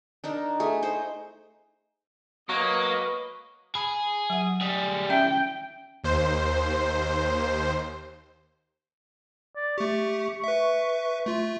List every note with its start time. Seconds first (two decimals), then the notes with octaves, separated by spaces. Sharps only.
0.24 D4 D#4 A#4
0.60 A3 E4 G#4
0.82 D#4 C5 D#5
2.49 F#3 A#3 B4 D#5 C#6
3.75 G#4 B5
4.30 F#3 F#5
4.61 G3 G#4
5.10 C#4 E5 G5
6.04 D#2 C5
9.56 D5
9.78 A3 G4 C#6
10.44 B4 E5
11.26 A3 F4